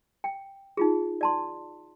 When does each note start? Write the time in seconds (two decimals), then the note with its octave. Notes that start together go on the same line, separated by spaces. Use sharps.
0.24 G5
0.77 D#4 F4 G#4
1.21 D5 A5 C6